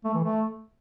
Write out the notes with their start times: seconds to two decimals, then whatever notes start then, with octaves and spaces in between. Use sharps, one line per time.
0.05 A3
0.14 E3
0.24 A3